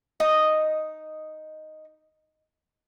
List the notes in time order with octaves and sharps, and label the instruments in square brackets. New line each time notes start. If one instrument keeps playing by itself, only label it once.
[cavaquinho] D#4 D#5 D#6